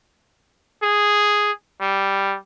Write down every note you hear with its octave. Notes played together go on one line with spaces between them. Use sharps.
G#4
G3